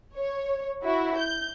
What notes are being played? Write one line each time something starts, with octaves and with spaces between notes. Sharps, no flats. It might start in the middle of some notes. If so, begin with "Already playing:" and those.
C#5
E4 F#4
G6